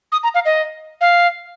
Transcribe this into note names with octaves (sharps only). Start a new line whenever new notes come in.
D#6
A#5
F5
D#5
F5